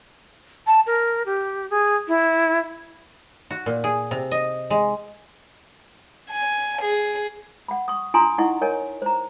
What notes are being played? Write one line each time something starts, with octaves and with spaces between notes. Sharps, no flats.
A5
A#4
G4
G#4
E4
F#4
A#2
G#4
C3
D#5
G#3
G#5
G#4
F#5 B5
C#6 D#6
D4 F4 G#5 A#5 C6 D#6
D#4 E4 D#5 F#5 C#6
A#4 C#5 D#5 G#5
C5 A#5